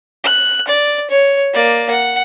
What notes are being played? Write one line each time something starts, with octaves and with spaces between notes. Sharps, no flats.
F#6
D5
C#5
A#3 D5
F#5